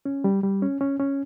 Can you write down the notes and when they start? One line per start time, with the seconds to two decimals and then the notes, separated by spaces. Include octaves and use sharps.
0.06 C#4
0.24 G3
0.43 G3
0.62 C#4
0.81 C#4
1.00 C#4